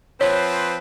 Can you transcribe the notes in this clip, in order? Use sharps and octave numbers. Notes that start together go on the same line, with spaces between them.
F3 C4 B4 C#5